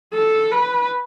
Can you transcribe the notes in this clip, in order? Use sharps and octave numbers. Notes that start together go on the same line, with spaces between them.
A4
B4